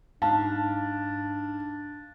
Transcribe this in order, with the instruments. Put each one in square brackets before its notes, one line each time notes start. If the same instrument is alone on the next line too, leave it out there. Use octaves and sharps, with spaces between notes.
[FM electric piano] G#2 D#4 F6 [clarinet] D4 [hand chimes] F5 [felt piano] A5